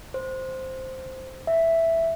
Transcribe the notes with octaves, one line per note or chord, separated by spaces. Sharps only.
C5
E5